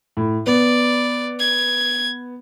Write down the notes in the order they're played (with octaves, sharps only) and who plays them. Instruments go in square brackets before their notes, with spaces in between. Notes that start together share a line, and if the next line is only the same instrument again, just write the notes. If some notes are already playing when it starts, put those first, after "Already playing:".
[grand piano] A2
[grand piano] B3 [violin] D5
[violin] G#6